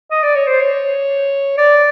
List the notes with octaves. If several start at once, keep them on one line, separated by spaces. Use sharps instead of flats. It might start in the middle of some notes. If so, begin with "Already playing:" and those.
D#5
D5
C#5
C5
C#5
D5